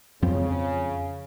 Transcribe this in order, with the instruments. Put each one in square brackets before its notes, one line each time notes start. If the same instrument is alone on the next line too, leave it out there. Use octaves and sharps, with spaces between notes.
[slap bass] F2 F3 C4 [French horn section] C#3